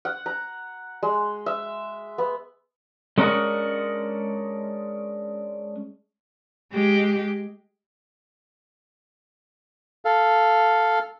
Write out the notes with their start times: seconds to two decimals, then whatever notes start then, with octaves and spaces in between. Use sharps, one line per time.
0.05 F#5
0.26 A#5
1.03 G#3
1.46 E5
2.18 B3
3.18 G#3 C#4 D4 A#4 D#5 F#5
6.72 G#3 G4
10.05 A4 F5